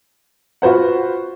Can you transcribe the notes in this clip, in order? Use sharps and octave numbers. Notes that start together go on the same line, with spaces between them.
F4 F#4 B4 C5 F#5